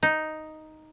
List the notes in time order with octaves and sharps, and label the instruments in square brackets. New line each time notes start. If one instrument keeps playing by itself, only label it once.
[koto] D#4